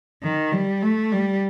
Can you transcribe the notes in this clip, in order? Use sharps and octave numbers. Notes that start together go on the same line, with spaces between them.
D#3
G3
A3
G3